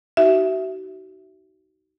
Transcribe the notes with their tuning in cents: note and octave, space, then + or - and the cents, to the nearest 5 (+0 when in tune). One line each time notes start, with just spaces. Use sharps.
D#4 +10 F#4 +35 E5 +0